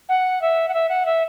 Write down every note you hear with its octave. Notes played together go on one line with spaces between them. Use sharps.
F#5
E5
F#5
E5
F#5
E5